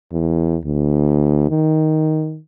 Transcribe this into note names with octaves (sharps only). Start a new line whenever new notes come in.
E2
D2
D#3